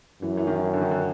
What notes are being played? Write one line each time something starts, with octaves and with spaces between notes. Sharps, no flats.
F#2 E3
E3
D#3
D3
D#3
D3